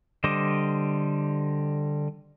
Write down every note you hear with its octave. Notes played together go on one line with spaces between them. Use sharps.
D3 G3 C5 D#5 D6